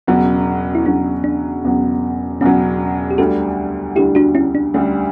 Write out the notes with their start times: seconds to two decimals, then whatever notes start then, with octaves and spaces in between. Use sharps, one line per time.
0.07 E1 E2 C#3 F#3 C#4
0.75 E4
0.86 E1 E2 C#3 F#3 D4
1.24 D4
1.64 E1 E2 C#3 F#3
2.41 E1 E2 C#3 F#3 C#4
3.11 G4
3.18 D2 D3 G3 F#4 A4
3.96 D2 D3 G3 E4 G4
4.15 D4 F#4
4.35 C#4 E4
4.55 D4
4.74 D2 D3 G3 C#4